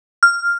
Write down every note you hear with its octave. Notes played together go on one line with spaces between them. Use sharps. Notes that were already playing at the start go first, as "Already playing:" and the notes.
F6